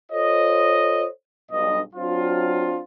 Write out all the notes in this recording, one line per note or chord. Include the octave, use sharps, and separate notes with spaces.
F4 A4 C5 C#5 D#5
B1 G2 D#5
F#3 C4 D4 F4